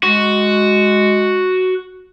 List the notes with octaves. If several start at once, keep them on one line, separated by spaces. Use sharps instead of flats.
G#3 F#4